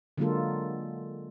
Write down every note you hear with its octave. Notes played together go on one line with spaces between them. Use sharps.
D3 F#3 G#3 A#3 F4 A4